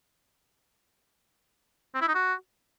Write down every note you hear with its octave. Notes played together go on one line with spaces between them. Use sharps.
C4
E4
D#4
F#4